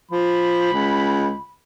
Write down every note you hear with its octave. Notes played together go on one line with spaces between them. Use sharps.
F3 B5
C#2